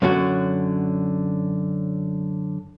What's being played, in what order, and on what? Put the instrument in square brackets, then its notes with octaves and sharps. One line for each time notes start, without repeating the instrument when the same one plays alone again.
[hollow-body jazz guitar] F#2 D3 C#4 F#4